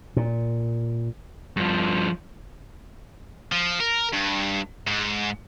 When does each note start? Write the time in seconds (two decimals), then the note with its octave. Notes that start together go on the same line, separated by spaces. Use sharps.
0.17 A#2
1.57 G2 F3
3.52 F3
3.80 A#4
4.13 G2
4.87 G#2